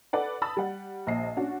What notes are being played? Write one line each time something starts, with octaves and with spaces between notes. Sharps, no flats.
A4 B4 D5 F#5
A5 B5 D#6 E6 A6
G3 F#5
A#1 D#5 C7
C#4 D4 F#4